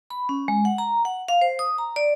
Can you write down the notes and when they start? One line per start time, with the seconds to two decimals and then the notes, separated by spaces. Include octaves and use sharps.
0.10 B5
0.29 C#4
0.48 G#3
0.65 F#5
0.78 A#5
1.05 F#5
1.28 F5
1.41 C5
1.59 D#6
1.78 A#5
1.96 D5